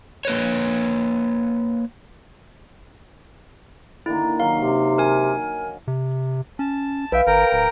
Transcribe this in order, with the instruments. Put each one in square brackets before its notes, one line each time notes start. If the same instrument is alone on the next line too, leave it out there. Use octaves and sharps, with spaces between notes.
[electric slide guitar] A#3 B4 C#5
[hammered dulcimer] D3 D#3 A#3 [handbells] E4
[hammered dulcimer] D#3 F#3 C#6 [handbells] F5
[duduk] C3
[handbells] A#4 G#5
[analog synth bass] C3
[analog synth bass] C#4 [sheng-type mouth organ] A5
[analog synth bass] B1 [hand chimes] B4 F5 [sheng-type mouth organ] E5 G5
[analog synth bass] G#1 [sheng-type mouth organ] A#4 G5 A#5
[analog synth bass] D1